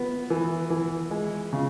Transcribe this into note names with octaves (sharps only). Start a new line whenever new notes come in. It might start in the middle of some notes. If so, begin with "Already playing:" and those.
Already playing: B3
E3
E3
G#3
C#3